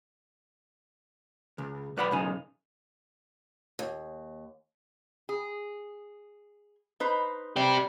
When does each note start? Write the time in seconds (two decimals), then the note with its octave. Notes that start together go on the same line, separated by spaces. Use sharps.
1.58 C#2
1.97 B1 B4 D5 F#5 G5 B5
2.11 B1 F#2 C#3 D#4 G#5
3.79 D#2
5.29 G#4
7.00 D#4 B4 C5
7.56 G3 C4 G4